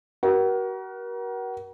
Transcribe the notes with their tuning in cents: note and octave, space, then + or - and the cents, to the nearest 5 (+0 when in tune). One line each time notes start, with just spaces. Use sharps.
F#4 +35 A#4 +35